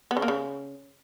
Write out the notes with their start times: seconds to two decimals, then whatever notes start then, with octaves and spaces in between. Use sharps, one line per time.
0.11 B3
0.17 C#3
0.22 A#3
0.28 C#3